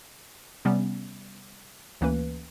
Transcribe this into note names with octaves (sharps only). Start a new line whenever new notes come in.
C3 G3 B3 C#4
D2 E3 A#3 C#4 B4